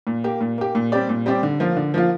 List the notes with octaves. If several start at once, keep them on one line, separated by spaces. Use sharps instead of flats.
A#2
A#3 G4
A#2
A#3 G4
A#2
G3 C4 G4 D5
A#2
G3 C4 G4 D5
D3
F3 A#3 F4
D3
F3 A#3 F4